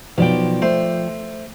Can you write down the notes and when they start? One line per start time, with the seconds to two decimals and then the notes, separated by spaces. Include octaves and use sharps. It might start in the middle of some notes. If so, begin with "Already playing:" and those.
0.18 B1 F3 D5 G5
0.62 A3 C5